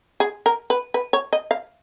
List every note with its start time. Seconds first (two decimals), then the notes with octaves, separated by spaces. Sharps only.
0.20 G#4
0.46 A#4
0.70 B4
0.94 B4
1.13 C#5
1.33 D#5
1.51 F5